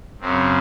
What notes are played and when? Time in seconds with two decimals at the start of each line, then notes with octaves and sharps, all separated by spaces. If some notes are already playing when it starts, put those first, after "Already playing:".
0.21 F#2 C#3 C4